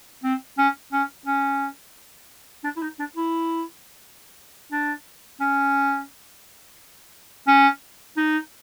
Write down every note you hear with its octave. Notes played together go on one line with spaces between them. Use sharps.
C4
C#4
C#4
C#4
D4
E4
D#4
D4
E4
D4
C#4
C#4
D#4